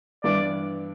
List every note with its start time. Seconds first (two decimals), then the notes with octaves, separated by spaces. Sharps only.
0.24 G2 E3 B3 D4 D5